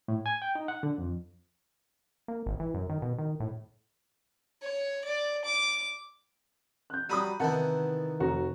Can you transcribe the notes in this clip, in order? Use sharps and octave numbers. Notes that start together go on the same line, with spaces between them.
A2
G#5
G5
D#4
F#5
D3
F2
A#3
G#1
E3
F#2
D#3
B2
D#3
A2
C#5
D5
D6
F#6 G6
F#3 G3 B5 D#6 D#7
C3 D#3 E3 B3 F#5 A5
F1 F#4 A#5